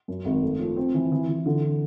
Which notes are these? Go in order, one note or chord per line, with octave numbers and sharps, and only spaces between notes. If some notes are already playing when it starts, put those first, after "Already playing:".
F#2
G#1
A3
F3
C4
E3
E3
E3
D3